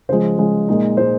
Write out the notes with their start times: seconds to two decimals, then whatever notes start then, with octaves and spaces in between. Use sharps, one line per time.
0.09 C#3 F3 G#3 C5
0.38 C#3 F3 G#3
0.68 A#2 G#3 D#4
0.97 A#2 G#3 D#4 C5